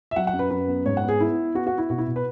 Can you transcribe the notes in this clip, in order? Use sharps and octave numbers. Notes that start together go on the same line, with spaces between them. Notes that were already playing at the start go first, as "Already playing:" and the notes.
E5
F#3 F#5
F#5
F#2
B4
F#2 B4
B3
G#2 C#5
F#5
B3
G#4
B3 E4
B3
B3 F#4
F#4
B3
E4
B2 F#4
E4
B2
B4